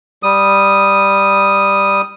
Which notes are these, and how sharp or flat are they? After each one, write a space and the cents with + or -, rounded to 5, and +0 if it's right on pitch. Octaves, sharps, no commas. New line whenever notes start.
G3 +0 D#6 +0